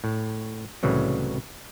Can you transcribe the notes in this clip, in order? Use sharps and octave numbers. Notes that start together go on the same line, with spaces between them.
A2
C2 A2 C#3 E3 F#3